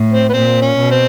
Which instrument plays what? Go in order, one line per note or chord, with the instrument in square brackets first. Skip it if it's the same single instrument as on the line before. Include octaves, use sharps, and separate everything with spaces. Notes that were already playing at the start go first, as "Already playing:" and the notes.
Already playing: [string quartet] A2
[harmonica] C4
B3
[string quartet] A#2 [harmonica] C4
[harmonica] C#4
[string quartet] B2
[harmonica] C4